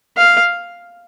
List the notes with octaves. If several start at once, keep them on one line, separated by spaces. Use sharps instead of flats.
F5